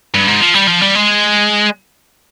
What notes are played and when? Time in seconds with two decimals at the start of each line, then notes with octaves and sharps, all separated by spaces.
0.15 G2
0.28 G#2
0.40 F3
0.54 G3
0.67 F3
0.81 G3
0.95 G#3